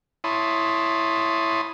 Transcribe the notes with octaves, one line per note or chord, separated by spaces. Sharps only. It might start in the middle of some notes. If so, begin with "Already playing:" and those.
E4 C#5 A5 B5 C6 D#6